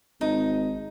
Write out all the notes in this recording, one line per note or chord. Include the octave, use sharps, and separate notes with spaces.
G#1 D#4